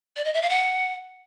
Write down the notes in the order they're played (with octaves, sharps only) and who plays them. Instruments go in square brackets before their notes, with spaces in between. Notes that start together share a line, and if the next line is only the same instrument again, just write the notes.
[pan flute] D5
D#5
E5
F5
F#5